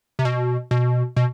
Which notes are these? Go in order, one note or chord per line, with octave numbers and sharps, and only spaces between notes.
C3
B2
B2
B2